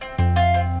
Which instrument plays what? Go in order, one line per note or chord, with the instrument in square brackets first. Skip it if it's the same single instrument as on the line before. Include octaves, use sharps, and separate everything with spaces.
[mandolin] C4
[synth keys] F2 [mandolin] C4
[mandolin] F4
C4